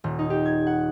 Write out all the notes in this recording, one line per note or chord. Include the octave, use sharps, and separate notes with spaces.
D#1
D#4
G4
G#6
F#5